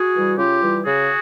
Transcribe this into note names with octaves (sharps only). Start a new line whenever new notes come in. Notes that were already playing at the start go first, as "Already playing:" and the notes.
Already playing: F#4 G#4
E3 G3
C#3 F4 G4
E3 G3
C#3 F#4 G#4